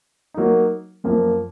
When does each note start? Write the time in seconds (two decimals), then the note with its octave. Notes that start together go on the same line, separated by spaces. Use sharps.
0.34 F#3 A#3 D#4
1.04 F#2 F3 A#3